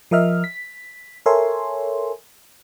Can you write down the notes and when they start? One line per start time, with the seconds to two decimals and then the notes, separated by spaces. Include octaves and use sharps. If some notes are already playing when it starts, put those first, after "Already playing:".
0.11 F3 A#4 D#5 E5 F6
0.44 B6
1.26 A4 A#4 C#5 E5 G#5 C6